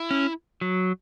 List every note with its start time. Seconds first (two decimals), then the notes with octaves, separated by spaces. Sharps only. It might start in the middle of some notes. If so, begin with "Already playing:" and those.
Already playing: E4
0.11 C#4
0.61 F#3